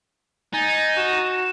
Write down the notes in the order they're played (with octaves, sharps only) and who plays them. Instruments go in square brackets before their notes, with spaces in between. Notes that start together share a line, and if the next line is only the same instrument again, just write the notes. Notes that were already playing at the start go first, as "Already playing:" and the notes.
[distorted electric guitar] D#4 [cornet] G#5 [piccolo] A6
[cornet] F#4 [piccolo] E7